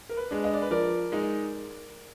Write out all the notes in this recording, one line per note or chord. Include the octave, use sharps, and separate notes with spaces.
A#4
B4
G#3 D4
D#5
D5
B4
F3 A#4 D5
G#3 D#4